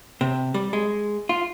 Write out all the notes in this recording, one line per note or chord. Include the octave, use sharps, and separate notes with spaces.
C3
G3
G#3
F4